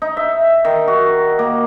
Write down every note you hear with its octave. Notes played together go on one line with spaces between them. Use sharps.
D#4
E5
D#3
F#4
A#3